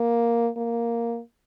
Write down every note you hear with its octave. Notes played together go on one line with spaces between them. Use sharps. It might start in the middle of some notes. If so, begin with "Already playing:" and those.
Already playing: A#3
A#3